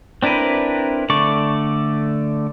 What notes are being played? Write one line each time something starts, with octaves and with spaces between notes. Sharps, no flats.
C4 D4 E4 A#4 B4
D3 A3 D5 C#6